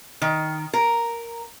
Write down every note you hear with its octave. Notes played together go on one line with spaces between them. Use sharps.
D#3
A#4